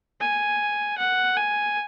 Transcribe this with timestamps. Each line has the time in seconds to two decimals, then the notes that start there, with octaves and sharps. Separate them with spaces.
0.21 G#5
0.98 F#5
1.37 G#5